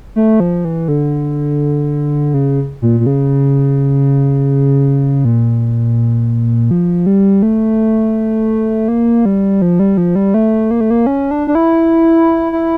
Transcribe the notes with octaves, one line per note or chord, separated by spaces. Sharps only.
A3
F3
E3
D3
C#3
A#2
A#2
C#3
A#2
F3
G3
A3
A#3
G3
F3
G3
F3
G3
A3
A#3
A3
A#3
C#4
D4
D4
E4
E4